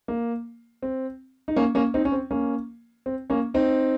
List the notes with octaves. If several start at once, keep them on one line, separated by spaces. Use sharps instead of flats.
A#3
C4
D#4
A#3 C#4
A#3 C#4
C4 D#4
C#4
C4
A#3 C#4
C4
A#3 C#4
C4 D#4